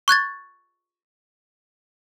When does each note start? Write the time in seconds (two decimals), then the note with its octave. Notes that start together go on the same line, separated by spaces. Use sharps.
0.08 C#6 F#6 G#6 A6